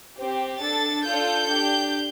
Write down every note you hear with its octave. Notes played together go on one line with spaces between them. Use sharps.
C4 G4
D4 A4 A6
D4 F4 A4 G6
D4 G4